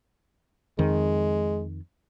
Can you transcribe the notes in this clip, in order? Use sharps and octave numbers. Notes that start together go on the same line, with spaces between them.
F2 D#3 G#3